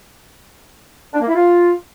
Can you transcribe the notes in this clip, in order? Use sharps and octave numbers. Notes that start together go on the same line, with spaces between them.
D4
A#3
E4
F4